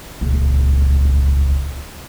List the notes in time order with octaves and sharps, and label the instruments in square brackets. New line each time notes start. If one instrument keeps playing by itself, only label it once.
[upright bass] D#1 C#2